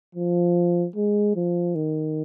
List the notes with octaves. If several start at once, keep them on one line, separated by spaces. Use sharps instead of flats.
F3
G#3
F3
D#3